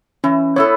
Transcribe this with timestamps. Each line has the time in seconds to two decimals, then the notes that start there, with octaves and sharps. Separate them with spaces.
0.24 E3 C#4
0.56 B3 E4 A4 C#5